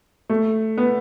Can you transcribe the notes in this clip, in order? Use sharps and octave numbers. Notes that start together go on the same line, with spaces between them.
A3
B3